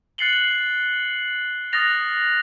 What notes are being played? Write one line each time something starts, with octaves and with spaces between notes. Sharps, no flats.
F#6 A6 C7 C#7 F#7 G7
D#6 F6 F#6 A6 A#6 F7